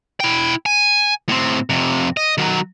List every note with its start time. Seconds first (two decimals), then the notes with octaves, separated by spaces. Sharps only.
0.20 E4 G5
0.66 G#5
1.29 A2 C4
1.70 F2 C3
2.17 D#5
2.38 D#3 F#3